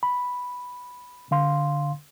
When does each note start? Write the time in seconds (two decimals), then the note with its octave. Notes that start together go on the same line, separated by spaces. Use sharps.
0.03 B5
1.31 D3 F5 C6